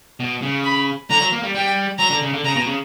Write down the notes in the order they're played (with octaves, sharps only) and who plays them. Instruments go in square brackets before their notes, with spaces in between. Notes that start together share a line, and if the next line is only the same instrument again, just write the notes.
[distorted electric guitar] B2
C#3
[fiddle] B5
[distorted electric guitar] D3 [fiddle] A#5
[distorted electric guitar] F#3
A#3
G3
[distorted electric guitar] G3 [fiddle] G5
[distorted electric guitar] F#3 [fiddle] A#5
[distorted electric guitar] D3
C#3
D3
[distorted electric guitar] C#3 [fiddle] A#5
[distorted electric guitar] B2
C#3